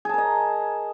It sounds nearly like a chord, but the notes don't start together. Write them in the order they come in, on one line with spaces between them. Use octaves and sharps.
G#4 A5 A#4 D#5